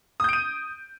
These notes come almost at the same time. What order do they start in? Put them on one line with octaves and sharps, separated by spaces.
D#6 G6 D7 D#7